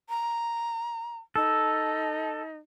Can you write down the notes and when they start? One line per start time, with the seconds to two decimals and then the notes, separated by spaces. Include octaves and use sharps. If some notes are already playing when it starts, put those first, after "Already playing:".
0.09 A#5
1.36 D#4 A4